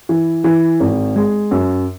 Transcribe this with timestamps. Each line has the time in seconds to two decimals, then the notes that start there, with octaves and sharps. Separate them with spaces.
0.09 E3
0.44 E3
0.80 G#1
1.16 G#3
1.51 F#2